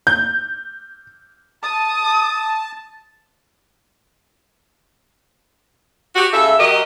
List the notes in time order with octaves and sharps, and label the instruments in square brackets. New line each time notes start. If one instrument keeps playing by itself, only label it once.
[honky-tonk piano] G6
[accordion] A5 [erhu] D#6
[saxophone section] F#4 G4
C#3 A4 E5
F#3 G4 A#4 D#5